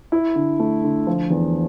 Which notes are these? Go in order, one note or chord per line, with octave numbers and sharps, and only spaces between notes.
E4
D3
A3
D3
F3
E2